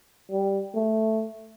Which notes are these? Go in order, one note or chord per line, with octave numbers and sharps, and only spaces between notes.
G3
A3